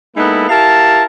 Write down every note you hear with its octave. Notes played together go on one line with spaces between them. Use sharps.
G#3 A#3 B3 D#4 E4 A4
E4 G4 A#4 F5 A5